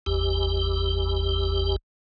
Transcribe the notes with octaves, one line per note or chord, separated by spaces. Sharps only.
G#1 E2 G4